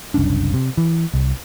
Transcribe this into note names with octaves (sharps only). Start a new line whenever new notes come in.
F#1 C2 C#4 D4
C3
E3
C2